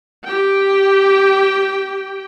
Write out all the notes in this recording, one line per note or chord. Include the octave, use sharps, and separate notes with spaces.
G4 G5